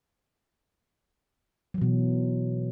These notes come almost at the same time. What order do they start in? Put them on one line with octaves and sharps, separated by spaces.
F#3 E3 B2